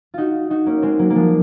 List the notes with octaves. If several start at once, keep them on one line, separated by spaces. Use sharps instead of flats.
D#4 F4 F#4
D#4 F#4
A#3 C#4
G#3 C4
F#3 A#3
A#3
F3 G#3